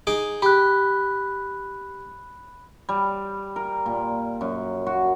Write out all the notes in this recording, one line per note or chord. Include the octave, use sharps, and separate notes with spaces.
D#4 G#4 D6
G4 B5 F#6
G3
A#4
A#2
F#2
F#4